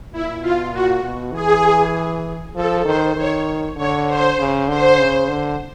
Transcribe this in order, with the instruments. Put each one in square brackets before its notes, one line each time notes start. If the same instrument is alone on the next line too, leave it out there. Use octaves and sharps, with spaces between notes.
[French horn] A#2 [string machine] E4
[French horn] B2 [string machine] F4
[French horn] A#2 [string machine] F#4
[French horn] B2
[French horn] E3 [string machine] G#4
[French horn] F3 [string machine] A4
[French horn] D#3 [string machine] C5
[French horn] D#3 [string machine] C#5
[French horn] D3 [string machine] C#5
[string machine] C5
[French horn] C#3
[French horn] D3 [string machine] C5
[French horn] C#3
D3